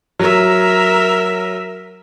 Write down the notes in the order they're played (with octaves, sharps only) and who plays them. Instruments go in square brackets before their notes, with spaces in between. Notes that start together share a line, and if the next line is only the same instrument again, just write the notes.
[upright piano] F#3 [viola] A#4 E5